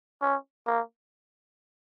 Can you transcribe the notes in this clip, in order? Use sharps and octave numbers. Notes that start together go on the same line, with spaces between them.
C#4
A#3